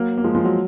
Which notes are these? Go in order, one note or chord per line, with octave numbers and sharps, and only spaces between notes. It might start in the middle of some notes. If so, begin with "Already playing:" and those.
Already playing: F#3 A#3
A#3
F3 G#3
F3 G#3
F#3